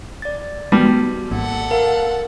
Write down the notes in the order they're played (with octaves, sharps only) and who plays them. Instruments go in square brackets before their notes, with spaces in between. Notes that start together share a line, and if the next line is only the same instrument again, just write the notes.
[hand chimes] D5 A6
[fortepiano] G3 [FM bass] B3 [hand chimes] F#4 A5
[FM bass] G#1 [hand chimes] A#3 [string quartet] A4 F#5
[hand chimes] A#4 F5